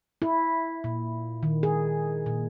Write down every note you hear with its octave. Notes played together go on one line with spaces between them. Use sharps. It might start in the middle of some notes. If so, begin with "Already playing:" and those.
E4
A#2
D#3
G#4
A#2